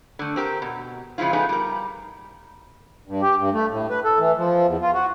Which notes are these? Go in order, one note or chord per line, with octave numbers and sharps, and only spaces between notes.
D3 A3
C4 G4 A#4
B2
C#3 F3 G#3 E4 F4
C#3 F3 A3 B3 D#4 G#4
G3 A#4
G2
G4
G2
A3
A2
B4
A4
E3
F3
E2
F4
F#4